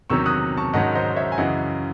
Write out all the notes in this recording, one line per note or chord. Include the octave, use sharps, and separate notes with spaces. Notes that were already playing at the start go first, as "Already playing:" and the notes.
E2 C3 D#3 F#3 C#4 C#6 E6
D#6 F#6
A5 C#6
G#2 D#3 F#3 C#4 D#5 F#5
C5 D#5
C#5 E5
G#5
F#2 C#3 E3 D#5 F#5